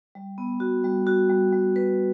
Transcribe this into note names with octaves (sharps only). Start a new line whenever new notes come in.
G3
B3
F#4
G3
F#4
G3
G3
B4